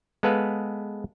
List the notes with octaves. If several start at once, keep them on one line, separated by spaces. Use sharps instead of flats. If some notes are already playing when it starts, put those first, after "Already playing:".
G#3 B3 A4 B4 F5